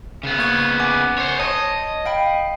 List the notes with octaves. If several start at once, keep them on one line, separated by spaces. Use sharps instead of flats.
C#3 B3
A#3 C#6 G#6
F#5 G#5 D6
C5 C#5
C#5 D#5 A5
F5 G5 B5